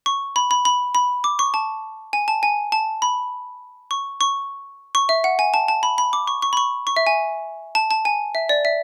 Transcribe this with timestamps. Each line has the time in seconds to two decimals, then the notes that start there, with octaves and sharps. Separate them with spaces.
0.06 C#6
0.36 B5
0.51 B5
0.65 B5
0.95 B5
1.24 D6
1.39 C#6
1.54 A5
2.13 G#5
2.28 A5
2.43 G#5
2.72 A5
3.02 B5
3.91 C#6
4.21 C#6
4.95 C#6
5.09 E5
5.24 F#5
5.39 G#5
5.54 A5
5.68 A5
5.83 B5
5.98 B5
6.13 D6
6.27 C#6
6.42 C#6
6.53 B5
6.57 C#6
6.87 C#6
6.96 E5
7.07 G#5
7.75 A5
7.91 A5
8.05 G#5
8.35 E5
8.49 D5
8.65 E5